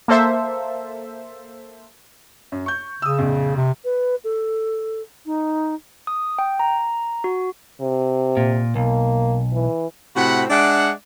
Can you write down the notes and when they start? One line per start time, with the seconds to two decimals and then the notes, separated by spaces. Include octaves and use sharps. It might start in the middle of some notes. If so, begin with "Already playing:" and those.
0.08 A#3 A4 C5 E5
2.52 F#2
2.66 C#6 G6
3.02 C#3 D#6 E6
3.19 A#1 F2
3.56 C3
3.85 B4
4.24 A4
5.26 D#4
6.07 D#6
6.39 G5
6.59 A#5
7.24 F#4
7.81 C3
8.37 A#2
8.76 B1 A#3
9.52 E3
10.16 A2 C3 C4 F#4 F#5 B5
10.50 G#3 D4 D5 E5 F#5